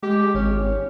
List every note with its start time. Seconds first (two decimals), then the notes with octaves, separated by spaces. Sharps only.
0.03 G#3 G4
0.34 G#1 C#4